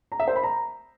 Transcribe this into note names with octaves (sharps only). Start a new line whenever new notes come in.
A#5
E5
C5
B5
A#5